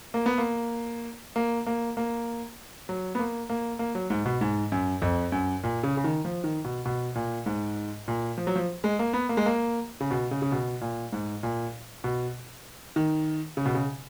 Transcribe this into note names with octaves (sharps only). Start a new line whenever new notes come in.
A#3
B3
A#3
A#3
A#3
A#3
F#3
B3
A#3
A#3
A#3
F#3
G#2
B2
G#2
F#2
F2
F#2
A#2
C#3
C#3
D#3
F3
D#3
B2
B2
A#2
G#2
A#2
F3
F#3
F3
G#3
A#3
B3
A#3
G#3
A#3
C#3
B2
C#3
C#3
B2
A#2
G#2
A#2
B2
D#3
C#3
B2
C#3